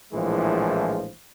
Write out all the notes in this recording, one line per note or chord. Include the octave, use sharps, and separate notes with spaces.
A#1 A2 E3 F3 G#3